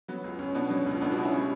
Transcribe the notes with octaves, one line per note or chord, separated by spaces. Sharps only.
F#3 B3
C#2
C#2 C#4
B2 B3 D4
F#3 C#4
C#2
C#2 B3 D4
D4 F#4
B2
C#4 E4
G3 C#4